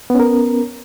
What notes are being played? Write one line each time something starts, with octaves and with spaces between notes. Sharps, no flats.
B3 C#4 A#4